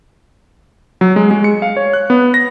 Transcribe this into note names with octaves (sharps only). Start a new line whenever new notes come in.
F#3
G#3
G#3
C#7
F5
C#5
F#6
B3
A#6